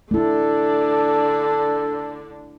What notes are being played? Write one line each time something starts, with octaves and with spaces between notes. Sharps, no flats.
D3 A3 D4 E4 A4